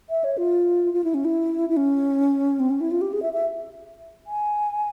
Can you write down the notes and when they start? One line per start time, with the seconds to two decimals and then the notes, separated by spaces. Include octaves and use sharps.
0.10 E5
0.24 C#5
0.38 F4
0.93 F4
1.04 E4
1.14 C#4
1.25 E4
1.69 E4
1.77 C#4
2.60 C4
2.70 C#4
2.80 E4
2.91 F4
3.01 G4
3.13 G#4
3.22 E5
3.33 E5
4.27 G#5